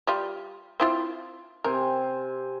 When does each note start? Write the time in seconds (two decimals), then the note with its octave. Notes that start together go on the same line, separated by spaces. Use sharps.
0.07 G3 F4
0.80 C4 E4 F4
1.64 C3 A#4 C5 G#5